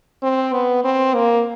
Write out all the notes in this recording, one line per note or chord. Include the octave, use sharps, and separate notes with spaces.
C4
B3
C4
A#3